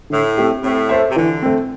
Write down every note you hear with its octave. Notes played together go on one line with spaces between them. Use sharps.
A2 D3
A3 C4 G4 E5
A2 C4
A4 C5 E5
C3
D3 E3
A3 C4